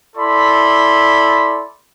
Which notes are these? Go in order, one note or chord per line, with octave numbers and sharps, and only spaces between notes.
E4 A4 D5 B5 C6